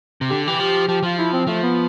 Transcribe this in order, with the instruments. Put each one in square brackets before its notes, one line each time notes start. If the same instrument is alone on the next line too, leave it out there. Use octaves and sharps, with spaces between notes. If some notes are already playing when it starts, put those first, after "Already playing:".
[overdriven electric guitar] C3
[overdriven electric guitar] D3 [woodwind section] G4
[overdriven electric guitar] E3 [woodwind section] G4
[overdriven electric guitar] F3
[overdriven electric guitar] F3 [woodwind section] G4
[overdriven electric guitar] F3 [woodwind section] F4
[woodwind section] E4
C4
[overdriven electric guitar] F3 [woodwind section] A3
[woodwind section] B3